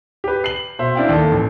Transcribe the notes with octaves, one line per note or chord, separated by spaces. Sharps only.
G4 B4
C7 F#7
B2 C5 E5
C4 D4 E4 F5 G5
D#2 A4
A1